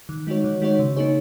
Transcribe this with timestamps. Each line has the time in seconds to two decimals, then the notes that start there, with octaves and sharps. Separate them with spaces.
0.09 D#3
0.27 G#3 D#4 F#4 C#5
0.44 D#3
0.62 G#3 D#4 F#4 C#5
0.79 C#3
0.96 A#3 D#4 G#4 C#5